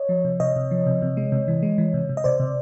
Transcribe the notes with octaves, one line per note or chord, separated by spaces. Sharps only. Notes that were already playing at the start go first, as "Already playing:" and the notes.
Already playing: C#5 D#5
F3
C3
C3 C#5 D#5
C3
F3
C3
C3
G#3
C3
E3
G#3
E3
C3
C3
D#5
C3 C5 D5
C3